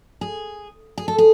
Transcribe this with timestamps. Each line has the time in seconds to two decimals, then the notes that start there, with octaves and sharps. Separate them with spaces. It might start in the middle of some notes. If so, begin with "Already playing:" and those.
0.21 G#4
0.98 G#4
1.08 A4
1.18 G#4